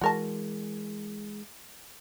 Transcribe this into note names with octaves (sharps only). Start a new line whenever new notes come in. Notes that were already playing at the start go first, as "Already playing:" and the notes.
E3 G#3 F#4 A#4 A5